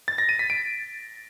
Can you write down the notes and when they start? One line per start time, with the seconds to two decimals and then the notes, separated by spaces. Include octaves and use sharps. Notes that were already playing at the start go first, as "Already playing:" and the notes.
0.08 A6
0.18 A#6
0.29 D#7
0.39 B6
0.50 D7